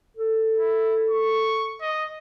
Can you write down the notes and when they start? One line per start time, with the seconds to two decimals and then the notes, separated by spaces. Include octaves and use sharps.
0.17 A4
0.58 E4
1.10 C#6
1.81 D#5